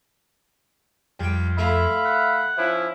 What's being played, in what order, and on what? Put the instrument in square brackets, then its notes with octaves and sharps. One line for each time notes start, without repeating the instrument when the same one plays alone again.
[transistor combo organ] F2 [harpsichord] G3 G5
[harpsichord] A3 E4 F4 [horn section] E5 F5 B5
[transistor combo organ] F#5
[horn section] F3 C#4 E4